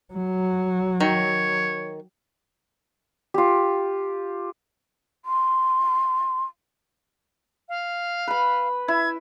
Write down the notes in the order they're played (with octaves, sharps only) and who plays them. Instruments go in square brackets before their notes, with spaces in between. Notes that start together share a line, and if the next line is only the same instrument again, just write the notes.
[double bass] F#3
[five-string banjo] D#3 [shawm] C#5
[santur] F4 G4
[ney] C6
[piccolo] F5
[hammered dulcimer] B4 B5
[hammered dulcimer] E4 [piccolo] G#6